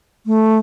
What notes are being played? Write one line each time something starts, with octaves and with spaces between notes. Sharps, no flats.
A3